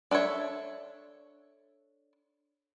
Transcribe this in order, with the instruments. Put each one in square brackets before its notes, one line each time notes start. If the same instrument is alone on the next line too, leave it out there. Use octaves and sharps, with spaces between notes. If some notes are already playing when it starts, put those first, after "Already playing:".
[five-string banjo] D4 A4 A#4 C#5 E5